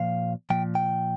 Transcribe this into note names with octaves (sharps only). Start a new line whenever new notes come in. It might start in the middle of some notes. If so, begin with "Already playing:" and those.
Already playing: A#2 F3 F5
A#2 F3 G5
G5